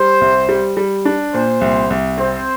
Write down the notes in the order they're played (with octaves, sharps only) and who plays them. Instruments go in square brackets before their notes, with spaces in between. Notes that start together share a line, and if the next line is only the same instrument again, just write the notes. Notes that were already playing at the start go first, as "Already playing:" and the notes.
Already playing: [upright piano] G3 [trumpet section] C5
[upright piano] C2
G3
G3
D4
[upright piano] A#2 [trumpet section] C5
[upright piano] C2
C2
[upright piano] C4 [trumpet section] C5